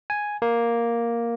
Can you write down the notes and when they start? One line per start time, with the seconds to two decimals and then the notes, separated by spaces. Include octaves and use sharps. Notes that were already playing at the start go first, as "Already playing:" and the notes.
0.10 G#5
0.42 A#3